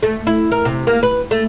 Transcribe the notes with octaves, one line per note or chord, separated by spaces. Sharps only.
A3
E4
A#4
C3
A#3
B4
A3